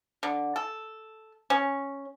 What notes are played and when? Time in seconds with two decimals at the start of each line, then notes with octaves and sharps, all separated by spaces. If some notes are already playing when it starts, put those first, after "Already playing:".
0.23 D3
0.56 A4
1.50 C#4